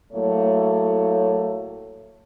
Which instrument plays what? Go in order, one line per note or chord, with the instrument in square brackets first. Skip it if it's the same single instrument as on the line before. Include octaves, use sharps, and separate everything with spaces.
[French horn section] A2 F#3 A3 A#3 C#5